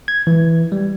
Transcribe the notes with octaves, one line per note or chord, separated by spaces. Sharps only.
G#6
E3
G3